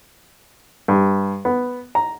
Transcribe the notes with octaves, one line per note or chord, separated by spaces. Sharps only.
G2
B3
A#5